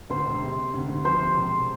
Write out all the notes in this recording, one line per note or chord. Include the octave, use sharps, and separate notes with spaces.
D2 C5
E1
C3
C3
D2
D2
F3 C5
C3
E1